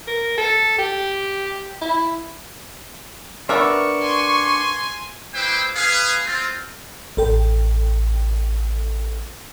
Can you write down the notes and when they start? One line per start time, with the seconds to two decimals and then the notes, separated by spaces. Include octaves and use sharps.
0.07 A#4
0.38 A4
0.78 G4
1.81 E4
3.49 B3 D4 A#4 E5 C#6
4.02 G#5 C6
5.35 G#3 E4 G4 B4 C5 G5
5.76 G#4 B4 F5
6.26 C4 F4
7.17 A1 A4 G5